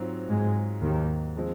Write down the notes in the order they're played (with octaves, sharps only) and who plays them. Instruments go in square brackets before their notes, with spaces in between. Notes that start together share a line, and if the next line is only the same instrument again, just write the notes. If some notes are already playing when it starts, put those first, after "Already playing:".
Already playing: [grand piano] G#2 F#3 C4 F4
[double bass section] G#2 G#3
D#2 D#3
[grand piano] F3 G#3 C4